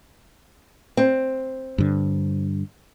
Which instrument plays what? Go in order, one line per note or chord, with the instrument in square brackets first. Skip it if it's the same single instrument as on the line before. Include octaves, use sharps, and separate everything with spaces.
[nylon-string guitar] C4
[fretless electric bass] G2 D3